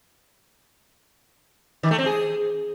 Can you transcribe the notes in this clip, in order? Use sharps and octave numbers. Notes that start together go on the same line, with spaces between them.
D#3
A3
C4
G#4